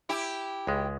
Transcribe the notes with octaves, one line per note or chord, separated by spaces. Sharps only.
E4 G4
C#2 G#3